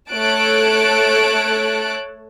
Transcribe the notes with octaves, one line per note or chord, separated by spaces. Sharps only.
A3 A4 C#5 A5 F#6 D7